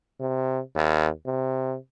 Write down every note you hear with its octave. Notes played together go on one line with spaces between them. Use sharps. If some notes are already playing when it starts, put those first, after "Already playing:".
C3
D#2
C3